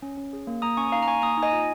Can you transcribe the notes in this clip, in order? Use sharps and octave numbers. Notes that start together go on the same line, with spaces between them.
C#4
C#4
G#4
A#3
A#3 A#5 D#6
C#4 G#5 C#6
D#4 F5 A#5
A#5
A#3 G#5 C#6
A#3 A#5 D#6
D#4
D#5 G#5
F4